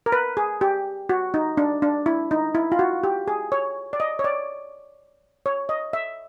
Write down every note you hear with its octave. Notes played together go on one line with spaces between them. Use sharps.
A#4
B4
G#4
G4
F#4
D#4
D4
D4
E4
D#4
E4
F4
F#4
G4
G#4
C#5
D5
D#5
C#5
D5
C#5
D#5
E5